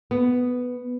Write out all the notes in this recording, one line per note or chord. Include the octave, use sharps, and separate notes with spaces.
B3